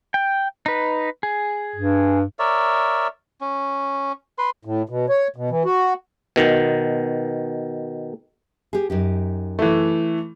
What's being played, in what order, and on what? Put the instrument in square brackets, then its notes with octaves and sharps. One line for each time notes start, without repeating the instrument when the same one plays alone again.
[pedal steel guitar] G5
D#4 B4
G#4
[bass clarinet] G2
[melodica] A#4 C#5 D5 E5
C#4
B4 C6
[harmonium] A2
B2
C#5
B2
E3
F#4
[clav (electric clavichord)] B2 D#3
[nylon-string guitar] G4 G#4
F#2 D#4 G4
[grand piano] E3 A3